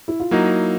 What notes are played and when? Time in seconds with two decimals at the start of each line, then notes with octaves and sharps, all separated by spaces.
0.08 E4
0.20 F4
0.31 F#3 A#3 D#4 E4 F#4